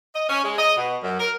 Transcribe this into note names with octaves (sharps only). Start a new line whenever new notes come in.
D#5
C#4
G#3
D#5
B2
F#2
A#4